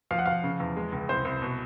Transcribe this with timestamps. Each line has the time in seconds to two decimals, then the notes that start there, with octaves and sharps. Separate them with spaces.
0.11 F3 F5
0.19 F#5
0.26 F3 F5
0.44 C#3
0.60 E2
0.77 G#3
0.92 C#2
1.09 C2 C5
1.25 C2
1.42 B2